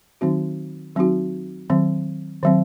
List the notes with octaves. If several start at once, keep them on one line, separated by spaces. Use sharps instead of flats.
D#3 F#3 C4 D#4 F#4
D#3 F#3 C4 D#4 F#4
D#3 F#3 C4
D#3 F#3 C4